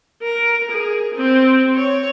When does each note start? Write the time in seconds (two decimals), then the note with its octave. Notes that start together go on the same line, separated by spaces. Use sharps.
0.22 A#4
0.71 G#4
1.14 C4
1.76 C#5